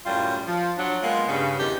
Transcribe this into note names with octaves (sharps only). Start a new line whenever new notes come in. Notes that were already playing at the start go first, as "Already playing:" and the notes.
F#2 A2 G3 F4
F3
F3 F#3 D4
G#3 A#3 B3 F4
G2 C#3
E2 D#3 D4 G4